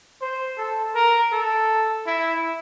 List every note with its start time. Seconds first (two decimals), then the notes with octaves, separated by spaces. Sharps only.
0.21 C5
0.58 A4
0.95 A#4
1.32 A4
2.06 E4